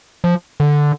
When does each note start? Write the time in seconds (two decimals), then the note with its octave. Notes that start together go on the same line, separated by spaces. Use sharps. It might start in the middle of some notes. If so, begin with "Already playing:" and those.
0.24 F3
0.60 D3